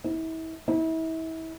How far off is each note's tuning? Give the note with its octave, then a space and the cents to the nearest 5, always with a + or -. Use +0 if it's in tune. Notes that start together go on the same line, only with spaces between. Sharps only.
E4 -35
E4 -35